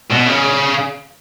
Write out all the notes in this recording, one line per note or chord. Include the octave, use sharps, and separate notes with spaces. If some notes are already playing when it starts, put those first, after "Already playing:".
B2
C#3